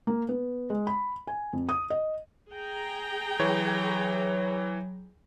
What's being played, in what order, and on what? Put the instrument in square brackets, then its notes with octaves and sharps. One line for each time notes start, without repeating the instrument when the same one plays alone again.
[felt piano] A#3
B3
G#3
B5
G#5
F2
D#6
D#5
[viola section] G#4 G5 A#5
[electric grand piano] E3 C#5 [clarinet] F#3